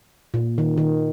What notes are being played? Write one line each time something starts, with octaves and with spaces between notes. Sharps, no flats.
A#2
D#3
D#3